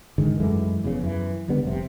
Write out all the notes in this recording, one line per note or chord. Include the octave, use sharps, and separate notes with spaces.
G#2 D3 D#3 G#3
F#2 E3 G#3 A3
F1 E2 A2 C#3
F#2 E3
C#2 D3 G3 B3
F1 C3